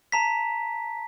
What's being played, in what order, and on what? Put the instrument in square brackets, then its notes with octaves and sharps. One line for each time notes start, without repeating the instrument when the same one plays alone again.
[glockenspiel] A5 A#5 B6